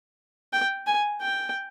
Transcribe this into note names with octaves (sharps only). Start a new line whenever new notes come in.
G5
G#5
G5